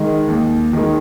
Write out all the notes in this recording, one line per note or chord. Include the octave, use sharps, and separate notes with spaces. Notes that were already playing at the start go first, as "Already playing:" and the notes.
Already playing: D#3 G#3
D#2
D#3 G#3